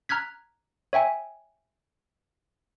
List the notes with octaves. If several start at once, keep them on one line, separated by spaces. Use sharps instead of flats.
A#5 F6 F#6 G#6 B6
C#5 E5 G5 G#5